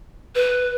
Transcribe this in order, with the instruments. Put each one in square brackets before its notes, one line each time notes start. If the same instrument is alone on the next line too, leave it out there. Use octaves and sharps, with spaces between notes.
[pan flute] B4